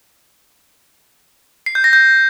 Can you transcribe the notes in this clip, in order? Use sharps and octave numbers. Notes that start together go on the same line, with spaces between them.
C7
G6
A#6
G6